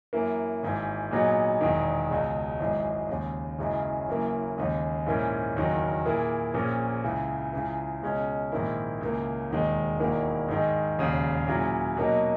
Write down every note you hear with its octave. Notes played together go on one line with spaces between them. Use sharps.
F#2 E3 A#3
G#1 G#2 E3
A#2 F#3 B3 D#4 G#4
E1 E2 D#3
C#2 B2 G#3
G#1 F#2 E3 G#3
D#2 C#3 G#3
F#1 F#2 C#3 E3 G#3
F#1 F#2 E3 A#3
D#2 C#3 G#3
A#1 G#2 E3 A#3 C#4
F#1 E2 D#3 F#3
A#2 A#3 E4 G#4
A#1 A#2 A#3 C#4 G#4
C#2 C#3 E3
C#2 C#3 E3
C#2 B2 G#3 C#4 G#4
A#1 G#2 D#3 A#3 E4
C#2 C#3 E3 A#3
E1 D#2 D#3 G#3
E1 E2 D#3 A#3 E4
G#2 D#3 G#3
E1 D#2 C#3
A#2 F#3 C#4 E4 G#4
B2 F#3 A#3 D#4